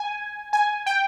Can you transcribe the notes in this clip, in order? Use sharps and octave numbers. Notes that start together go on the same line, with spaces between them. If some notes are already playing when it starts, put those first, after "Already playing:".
Already playing: G#5
G#5
G5